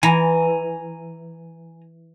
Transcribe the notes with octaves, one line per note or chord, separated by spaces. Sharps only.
E3 G#5 A#5